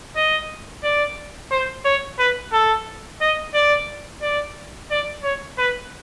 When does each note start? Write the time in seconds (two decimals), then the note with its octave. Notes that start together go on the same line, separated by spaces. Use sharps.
0.16 D#5
0.83 D5
1.51 C5
1.85 C#5
2.19 B4
2.53 A4
3.21 D#5
3.54 D5
4.22 D5
4.90 D5
5.23 C#5
5.58 B4